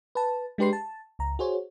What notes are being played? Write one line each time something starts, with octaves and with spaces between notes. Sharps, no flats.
B4 A5
G#3 D4 G4 B4 C6 C7
A5
C#2 A#5
F#4 G#4 C5 C#5